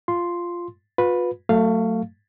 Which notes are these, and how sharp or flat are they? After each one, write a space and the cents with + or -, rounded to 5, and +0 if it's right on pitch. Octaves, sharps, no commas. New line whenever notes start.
F4 -5 C6 +0
F4 +40 B4 +0
F#3 +0 A3 +25 F5 +0